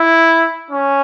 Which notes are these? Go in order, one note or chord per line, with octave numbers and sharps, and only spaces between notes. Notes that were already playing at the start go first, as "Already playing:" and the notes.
Already playing: E4
C#4